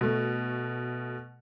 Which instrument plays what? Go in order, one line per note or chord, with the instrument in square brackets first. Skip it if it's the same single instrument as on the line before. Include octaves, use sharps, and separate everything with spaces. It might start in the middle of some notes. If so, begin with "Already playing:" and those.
[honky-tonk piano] B2 A3